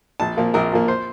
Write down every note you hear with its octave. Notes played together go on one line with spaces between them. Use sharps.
A#1 A5
A#2 F3 A#3
A#1 A#4
A#2 F3 A#3
C5